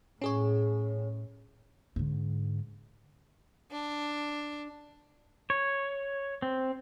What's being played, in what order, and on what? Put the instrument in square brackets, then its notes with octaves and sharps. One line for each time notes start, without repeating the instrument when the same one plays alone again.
[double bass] A2 [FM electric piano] C#4 G#4 C#5
[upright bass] G#2 D3
[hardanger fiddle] D4
[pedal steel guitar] C#5
C4